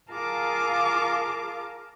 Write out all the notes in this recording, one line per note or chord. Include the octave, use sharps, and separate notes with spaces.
F4 G#4 A#4 F5 A5 D6